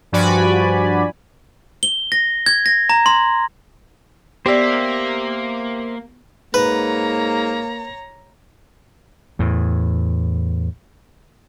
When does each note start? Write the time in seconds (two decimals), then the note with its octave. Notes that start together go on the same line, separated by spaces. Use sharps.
0.12 G2 F3 F#4 D5 G#5 B5
1.83 G7
2.12 A#6
2.46 G#6
2.66 A#6
2.90 A#5
3.06 C6
4.46 A#3 B3 G4 C5 D5 E5
6.54 G#2 A#3 B4 C#5 A#5
9.39 E2 A2